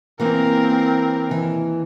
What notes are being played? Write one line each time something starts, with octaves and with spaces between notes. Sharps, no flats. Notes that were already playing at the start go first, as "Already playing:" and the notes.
E3 A#3 C4 A#4
D#2 E3